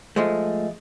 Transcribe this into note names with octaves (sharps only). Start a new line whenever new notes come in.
F3 G#3 A3